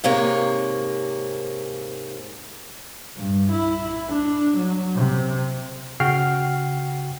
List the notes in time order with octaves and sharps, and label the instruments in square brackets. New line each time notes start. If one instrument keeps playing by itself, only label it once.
[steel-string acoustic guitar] G#2 C3 A#3 C#5
[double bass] G2
E4
D4
F#3
C3
[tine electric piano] C#3 F#4 G5 F6 C7